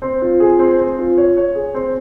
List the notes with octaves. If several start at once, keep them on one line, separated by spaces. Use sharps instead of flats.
C4
F4
G#4
C4
C4
F4
C#5
C#5
G#4
C4